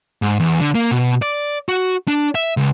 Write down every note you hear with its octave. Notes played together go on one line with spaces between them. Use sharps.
G#2
E2
D3
A#3
B2
D5
F#4
D4
E5
C#2